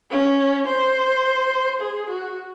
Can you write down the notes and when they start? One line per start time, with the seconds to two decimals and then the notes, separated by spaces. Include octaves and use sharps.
0.11 C#4
0.67 C5
1.81 G#4
2.10 F#4